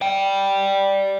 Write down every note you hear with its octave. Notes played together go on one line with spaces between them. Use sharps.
D5 G5